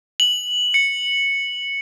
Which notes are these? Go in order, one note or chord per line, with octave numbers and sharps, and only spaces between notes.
F#7
C#7